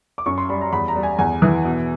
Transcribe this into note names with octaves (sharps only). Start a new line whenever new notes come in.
D6
F#2 C#6
C6
G3 B5
A#5
E2 B5
A#5
G3
G#5
E2 G#5
E3
B2